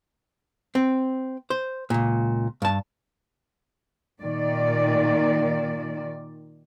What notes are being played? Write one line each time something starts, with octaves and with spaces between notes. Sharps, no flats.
C4
C5
C#2 A#2
G2 A5
A#2 D#3 D5